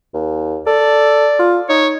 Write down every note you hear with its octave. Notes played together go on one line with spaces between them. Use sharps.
D#2
A4 D5
F4
D#4 C#5